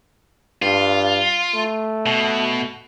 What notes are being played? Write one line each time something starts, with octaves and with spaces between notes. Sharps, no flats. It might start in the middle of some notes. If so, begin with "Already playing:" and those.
G2 F4
A3
B2